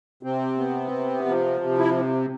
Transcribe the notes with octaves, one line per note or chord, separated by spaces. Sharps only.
C3 C4
B3
C3
F3
C3
E4